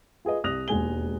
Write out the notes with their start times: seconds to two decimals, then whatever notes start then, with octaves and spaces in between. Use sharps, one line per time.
0.25 F4 G#4 B4 D#5
0.44 C2 D#6 F#6 A#6 F7
0.68 E1 D#2 G#3 G#5 G7